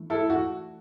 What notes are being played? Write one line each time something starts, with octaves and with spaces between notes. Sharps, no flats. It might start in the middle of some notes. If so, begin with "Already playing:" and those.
Already playing: E3 A3 D4
E4 A4
F#4